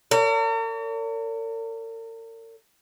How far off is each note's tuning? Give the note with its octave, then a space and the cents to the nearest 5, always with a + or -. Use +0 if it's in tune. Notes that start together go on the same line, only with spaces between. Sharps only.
A#4 -45 C#5 +40